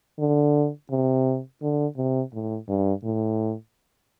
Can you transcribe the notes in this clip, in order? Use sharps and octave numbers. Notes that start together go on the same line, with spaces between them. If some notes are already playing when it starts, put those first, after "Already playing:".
D3
C3
D3
C3
A2
G2
A2